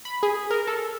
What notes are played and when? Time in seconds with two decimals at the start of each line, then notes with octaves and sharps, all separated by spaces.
0.05 B5
0.23 G#4
0.51 A#4
0.67 A4